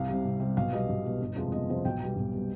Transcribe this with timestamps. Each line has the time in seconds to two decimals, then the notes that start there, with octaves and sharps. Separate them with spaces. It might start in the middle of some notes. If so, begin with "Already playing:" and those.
Already playing: C2 F5
0.09 C3 G3
0.25 C2
0.40 C3 G3
0.57 B1 F5
0.73 B2 G3 D#5
0.89 B1
1.05 B2 G3
1.21 G1
1.36 F2 C3 F3 G#3
1.52 G1 D#5
1.69 F2 C3 F3 G#3
1.85 B1 G5
2.01 B2 G3
2.16 B1
2.33 B2 G3